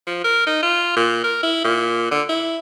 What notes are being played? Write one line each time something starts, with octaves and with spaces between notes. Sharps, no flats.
F3
A#4
D#4
F4
A#2
A#4
E4
A#2
D3
E4